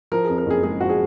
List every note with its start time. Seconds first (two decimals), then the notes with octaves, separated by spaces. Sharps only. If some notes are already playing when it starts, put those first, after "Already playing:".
0.12 F3 A#4
0.25 F2 G#4
0.38 A#4
0.46 F#1 G#4
0.63 G#3 G#4
0.81 F3 F#4
0.89 G#4